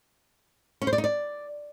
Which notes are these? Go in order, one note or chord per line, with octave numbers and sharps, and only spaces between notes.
C#4
C5
D5
D#4
D5